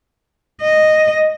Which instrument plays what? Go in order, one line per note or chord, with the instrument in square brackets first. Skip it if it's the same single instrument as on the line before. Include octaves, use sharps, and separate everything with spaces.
[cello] D#5